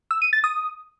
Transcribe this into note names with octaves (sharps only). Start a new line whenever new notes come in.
E6
D#7
A6
D#6